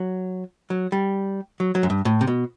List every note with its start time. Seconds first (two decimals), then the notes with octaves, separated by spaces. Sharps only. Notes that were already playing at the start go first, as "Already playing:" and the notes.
Already playing: F#3
0.70 F#3
0.92 G3
1.60 F#3
1.75 F#3
1.83 F#2
1.90 G2
2.05 A2
2.21 C3
2.27 B2